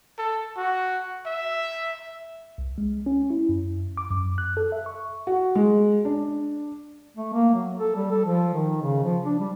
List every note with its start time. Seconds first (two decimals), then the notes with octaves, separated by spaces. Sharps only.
0.18 A4
0.57 F#4
1.26 E5
2.58 C2
2.78 G#3
3.06 C#4
3.30 E4
3.49 F#2
3.97 D6
4.11 F#2
4.38 F#6
4.57 A4
4.72 E5
4.86 C#6
5.27 F#4
5.55 G#3
6.05 D4
7.17 A3
7.33 A#3
7.54 F#3
7.79 A4
7.96 G3
8.11 A4
8.25 F3
8.54 D#3
8.82 C#3
9.04 F3
9.26 D4
9.39 G3